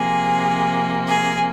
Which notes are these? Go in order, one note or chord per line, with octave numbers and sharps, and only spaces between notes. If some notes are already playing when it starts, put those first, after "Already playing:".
Already playing: C3 F3 A#3 G#4
G#4